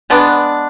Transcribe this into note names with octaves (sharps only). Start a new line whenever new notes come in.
G#3 B3 D4